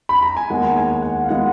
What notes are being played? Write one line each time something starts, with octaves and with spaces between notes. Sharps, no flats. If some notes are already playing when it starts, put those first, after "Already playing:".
B5
A#5
G#5
D#2 D#3 G#3 B3 F#5
G#5
F#5
F5
D#3 G#3 B3 F#5